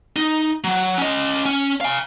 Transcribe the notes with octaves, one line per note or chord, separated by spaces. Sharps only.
D#4
F#3
C#4 D#5
C#4
F5 G#5